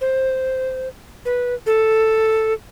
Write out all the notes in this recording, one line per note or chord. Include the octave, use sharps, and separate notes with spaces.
C5
B4
A4